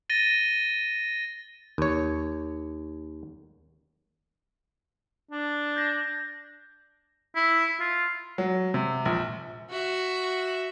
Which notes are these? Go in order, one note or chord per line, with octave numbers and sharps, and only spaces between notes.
A6 A#6 D#7 G7
D#2 C#5
D4
G6 A#6
E4
F4
F#3
C3
A#1
F#4 E5